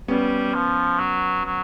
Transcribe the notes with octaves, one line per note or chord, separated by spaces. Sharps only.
G3 B3 C#4
F3
F#3
F#3